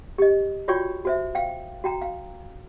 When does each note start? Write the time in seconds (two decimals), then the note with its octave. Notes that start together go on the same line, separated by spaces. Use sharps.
0.18 G4 D#5
0.68 F4 F#4 C#5 D5 G5 C#6
1.05 F#4 C5 E5
1.35 F5 G5
1.84 F#4 G5 A#5
2.02 F5